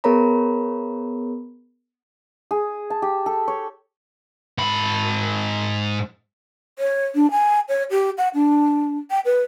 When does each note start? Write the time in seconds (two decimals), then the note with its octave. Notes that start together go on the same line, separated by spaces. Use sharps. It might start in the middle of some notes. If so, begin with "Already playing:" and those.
0.04 B3 G#4 A#4 C#5 A#5 B5
2.51 G#4
2.90 A5
3.02 G4
3.26 A4
3.48 C#5
4.58 G#2 B5
6.78 C#5
7.15 D4
7.31 G#5
7.69 C#5
7.90 G4
8.18 F#5
8.34 D4
9.11 G5
9.25 B4